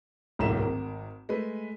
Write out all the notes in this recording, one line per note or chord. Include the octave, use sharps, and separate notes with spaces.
D1 B1 G#2 A#3 E4 E7
G#1 A#4
G#3 A3 B4